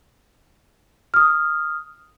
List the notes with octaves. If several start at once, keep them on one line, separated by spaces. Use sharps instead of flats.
D#6 F6